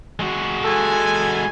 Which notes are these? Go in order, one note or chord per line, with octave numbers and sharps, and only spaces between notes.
G#3 F#4
A4 G#5